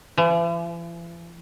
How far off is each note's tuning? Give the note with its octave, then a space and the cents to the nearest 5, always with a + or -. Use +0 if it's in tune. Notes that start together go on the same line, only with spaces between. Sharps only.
E3 +45